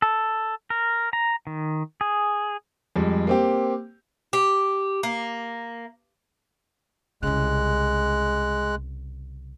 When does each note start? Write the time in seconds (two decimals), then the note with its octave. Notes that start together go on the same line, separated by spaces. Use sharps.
0.02 A4
0.70 A#4
1.13 A#5
1.47 D#3
2.01 G#4
2.96 F2 G3 G#3
3.27 A#3 C4 G4
4.33 G4
5.03 A#3
7.23 C2 C#3 G#3 F#6